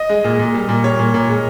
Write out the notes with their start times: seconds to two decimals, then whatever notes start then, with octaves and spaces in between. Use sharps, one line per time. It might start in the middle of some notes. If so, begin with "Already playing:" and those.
Already playing: D#5
0.10 G#3
0.24 A#2
0.39 A#2
0.54 G3
0.69 A#2
0.84 G3 C#5
0.99 A#2
1.14 A#2
1.29 G#3